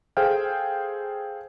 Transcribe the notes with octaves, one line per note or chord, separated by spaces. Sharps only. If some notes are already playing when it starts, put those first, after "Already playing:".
G#4 A4 C5 F5 G5 F6